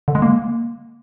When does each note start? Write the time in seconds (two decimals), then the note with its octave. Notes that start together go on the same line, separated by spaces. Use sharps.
0.08 D3
0.15 G#3
0.22 A#3